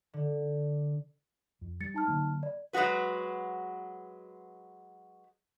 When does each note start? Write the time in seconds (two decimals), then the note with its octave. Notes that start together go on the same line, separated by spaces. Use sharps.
0.13 D3
1.61 F2
1.81 G3 A6 C#7
1.94 D#4 A5 F6
2.08 D3 F#3 A#3
2.43 D5
2.73 F#3 G#3 D#4 F#4 B4